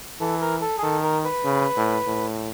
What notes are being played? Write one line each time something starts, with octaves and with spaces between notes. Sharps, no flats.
E3 A4
A#4
A4
G#4
D#3 A4
A#4
B4
C#3
A2
A2